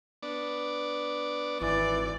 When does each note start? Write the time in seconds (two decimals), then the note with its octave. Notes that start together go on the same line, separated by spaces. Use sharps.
0.23 B3 D4 D5
1.61 G#1 E3 D5